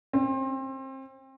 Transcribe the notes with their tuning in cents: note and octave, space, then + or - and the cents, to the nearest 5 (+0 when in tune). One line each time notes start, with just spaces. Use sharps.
C4 +30